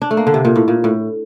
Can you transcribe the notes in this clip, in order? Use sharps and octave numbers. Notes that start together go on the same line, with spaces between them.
D4
A3
A#3
D3
C3
A#2
A2
A#2
A2